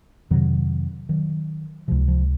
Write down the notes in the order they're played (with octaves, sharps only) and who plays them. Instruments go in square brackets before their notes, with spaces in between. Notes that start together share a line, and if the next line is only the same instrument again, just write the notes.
[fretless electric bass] F2 C3 D#3 F#3
D#3 F#3
C#2 C3 F3
F3